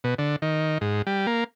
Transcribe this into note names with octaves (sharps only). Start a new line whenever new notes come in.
B2
D3
D#3
G#2
G3
A#3